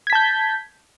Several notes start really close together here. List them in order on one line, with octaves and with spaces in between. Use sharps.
G#6 B6 A5 G6